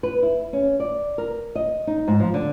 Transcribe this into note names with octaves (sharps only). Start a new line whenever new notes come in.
B4
E4
C#4
D5
A#4
D#5
D#4
G#2
F3
D3